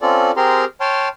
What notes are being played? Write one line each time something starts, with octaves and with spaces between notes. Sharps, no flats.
C4 C#4 F4 A4 D5
C4 G4 G#4 A#4 A#5 C6
C#5 G5 A5 C6 F6